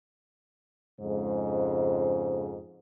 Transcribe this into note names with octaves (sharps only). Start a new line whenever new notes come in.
F2 G#2 C#3 G#3 C5